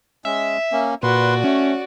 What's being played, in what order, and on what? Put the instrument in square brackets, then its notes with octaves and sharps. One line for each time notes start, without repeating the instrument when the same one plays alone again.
[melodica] G#3 C#4 [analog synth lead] E5
[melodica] A#3 C#4
[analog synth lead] A#2 [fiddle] F#4 D5 [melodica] B4 C6
[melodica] A3 [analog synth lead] C#4